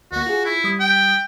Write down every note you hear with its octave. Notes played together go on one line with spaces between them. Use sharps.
D2 A#3 F#4
F4 G#4
E4
G3 D#6 B6
G5